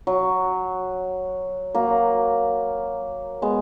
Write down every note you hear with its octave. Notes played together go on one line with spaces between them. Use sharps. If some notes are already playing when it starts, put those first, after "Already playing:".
F#3
F#3 A#3
G#3 B3